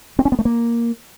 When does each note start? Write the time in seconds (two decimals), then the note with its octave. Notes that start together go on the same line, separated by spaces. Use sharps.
0.19 C4
0.25 C#4
0.32 B3
0.39 A3
0.45 A#3